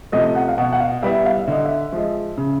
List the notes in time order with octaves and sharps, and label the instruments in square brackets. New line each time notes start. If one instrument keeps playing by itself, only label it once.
[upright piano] C3 F3 A3 [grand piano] D#5
[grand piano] F#5
F5
[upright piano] B2 [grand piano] F#5
[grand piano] F#5
F5
[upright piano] G3 B3 E4 [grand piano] E5
[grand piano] F5
E5
[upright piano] D3 [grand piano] D#5
[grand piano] E5
[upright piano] F3 G#3
C#3